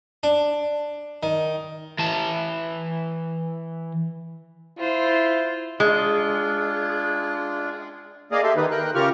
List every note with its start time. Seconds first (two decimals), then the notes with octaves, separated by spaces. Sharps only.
0.23 D4
1.23 D#3
1.98 E3 A5
4.79 E4 F4 C5
5.80 G#3 D4 F4
8.32 A#3 G#4 D5 D#5 F5
8.43 G4 A4 E5 C6
8.56 D#3 D#4 B4
8.71 A#4 G5 F#6
8.95 C#3 F4 G4 A#4 C#6 F6